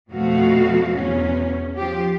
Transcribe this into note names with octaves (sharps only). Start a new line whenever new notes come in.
F2 B2 F3 A3 F#4 F5
E2 C#4
F3 G4